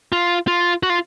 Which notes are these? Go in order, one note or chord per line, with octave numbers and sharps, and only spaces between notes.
F4
F4
F#4
F4